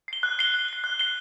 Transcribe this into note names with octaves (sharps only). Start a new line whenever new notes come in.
C7 G7
F#6
C7 G7
F#6
C7 G7
F#6
C7 G7